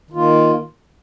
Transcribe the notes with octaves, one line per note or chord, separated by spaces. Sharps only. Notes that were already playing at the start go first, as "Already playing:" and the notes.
D#3 A#3 F4